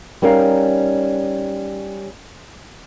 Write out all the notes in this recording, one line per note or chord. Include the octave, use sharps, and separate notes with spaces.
G3 C#4 D#4 A#4 F5